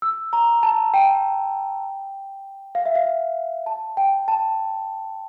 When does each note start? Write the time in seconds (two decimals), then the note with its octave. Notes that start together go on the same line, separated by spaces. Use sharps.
0.02 E6
0.33 A#5
0.63 A5
0.94 G5
2.75 F5
2.86 E5
2.95 F5
3.66 A5
3.97 G5
4.28 A5